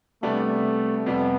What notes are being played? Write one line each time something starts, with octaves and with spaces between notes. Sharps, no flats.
C3 G3 A3 B3 D4
F2 C3 G3 B3